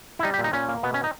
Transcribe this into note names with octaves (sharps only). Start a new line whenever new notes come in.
E4
G3 D#4
G4
A#2
D#4
A#2 C#4
A#3
B2 B3
C#4
D#4